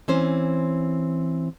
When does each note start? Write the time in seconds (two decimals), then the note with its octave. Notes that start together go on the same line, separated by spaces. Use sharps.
0.08 E3 C4 C#4 C5